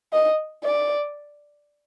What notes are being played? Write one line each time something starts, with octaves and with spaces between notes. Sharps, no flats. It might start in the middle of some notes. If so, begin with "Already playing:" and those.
D#5
D5